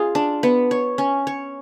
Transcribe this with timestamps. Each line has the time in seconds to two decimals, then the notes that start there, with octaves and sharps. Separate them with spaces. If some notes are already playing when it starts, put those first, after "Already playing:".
Already playing: F4 G#4
0.15 D4
0.43 B3
0.71 C#5
0.98 C#4
1.27 C#5